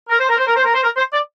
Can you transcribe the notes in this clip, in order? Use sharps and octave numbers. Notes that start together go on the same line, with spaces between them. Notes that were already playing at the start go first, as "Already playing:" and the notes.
A#4
C5
A#4
C5
A#4
C5
A#4
C5
A#4
C5
D5